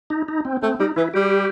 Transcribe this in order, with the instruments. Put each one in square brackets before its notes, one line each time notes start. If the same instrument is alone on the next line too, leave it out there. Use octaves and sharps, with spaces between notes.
[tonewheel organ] D#4
D#4
C4
[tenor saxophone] A3 [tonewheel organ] C4
[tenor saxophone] G3 [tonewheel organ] D#4
[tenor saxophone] E3 [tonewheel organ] E4
[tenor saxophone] G3 [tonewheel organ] G4